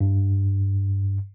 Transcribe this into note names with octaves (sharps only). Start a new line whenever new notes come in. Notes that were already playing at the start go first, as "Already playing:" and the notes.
G2